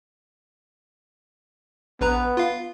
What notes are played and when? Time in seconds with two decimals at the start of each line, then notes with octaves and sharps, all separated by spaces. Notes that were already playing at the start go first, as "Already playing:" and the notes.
2.01 A#1 B3 B4 A#5
2.37 F4 F5